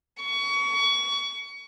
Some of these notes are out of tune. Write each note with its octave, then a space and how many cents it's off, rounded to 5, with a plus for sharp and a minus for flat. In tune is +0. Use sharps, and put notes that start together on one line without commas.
C#6 +30